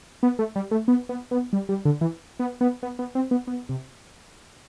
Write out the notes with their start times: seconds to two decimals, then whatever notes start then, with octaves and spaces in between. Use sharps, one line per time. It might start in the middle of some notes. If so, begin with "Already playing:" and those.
0.23 B3
0.39 A3
0.56 G3
0.71 A3
0.88 B3
1.09 B3
1.31 B3
1.53 G3
1.69 G3
1.85 D3
2.01 E3
2.40 B3
2.61 B3
2.83 B3
2.99 B3
3.15 C4
3.31 B3
3.47 B3
3.69 C3